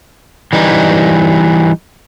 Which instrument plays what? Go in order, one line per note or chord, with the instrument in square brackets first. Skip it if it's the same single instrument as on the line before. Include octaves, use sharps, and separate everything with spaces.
[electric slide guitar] E3 G3 D#4